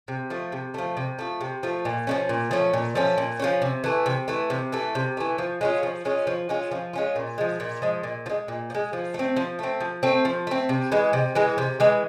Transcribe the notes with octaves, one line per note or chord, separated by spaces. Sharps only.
C3
F3 A3
C3
F3 A3
C3
F3 A3
C3
F3 A3
A#2
F3 A3 C#4
A#2
F3 A3 C#4
A#2
F3 A3 C#4
A#2
F3 A3 C#4
C3
E3 A3
C3
E3 A3
C3
E3 A3
C3
E3 A3
F3
G#3 C#4 F4
F3
G#3 C#4 F4
F3
G#3 C#4 F4
F3
G#3 C#4 F4
A#2
F3 G#3
A#2
F3 G#3
A#2
F3
G#3
A#2
F3
G#3
F3
A3 C4
F3
A3 C4
F3
A3 C4
F3
A3 C4
C3
E3 G#3
C3
E3 G#3
C3
E3 G#3